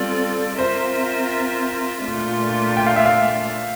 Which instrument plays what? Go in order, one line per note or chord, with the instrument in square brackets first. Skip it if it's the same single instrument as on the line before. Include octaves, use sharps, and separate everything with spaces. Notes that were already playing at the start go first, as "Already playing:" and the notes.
Already playing: [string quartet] G3 C4 F4 A4 D5
[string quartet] C4 F4 A#4 E5 [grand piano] C5
[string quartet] A#2 A3 D4 F4
[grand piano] G5
F5
E5
F5